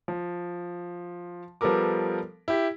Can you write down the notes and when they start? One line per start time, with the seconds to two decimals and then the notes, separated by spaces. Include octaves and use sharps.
0.08 F3
1.61 F3 G3 B3 A4 A#4 D6
2.48 E4 G4